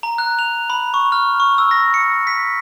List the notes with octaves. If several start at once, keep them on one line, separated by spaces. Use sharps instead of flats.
A#5
F#6
F7
B5
C#6
F6
C#6
E6
A#6
C#7
B6